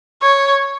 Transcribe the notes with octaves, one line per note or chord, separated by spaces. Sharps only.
C#5